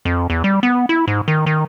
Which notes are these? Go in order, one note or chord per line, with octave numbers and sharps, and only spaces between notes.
F2
E2
G3
B3
E4
G#2
D#3
D#3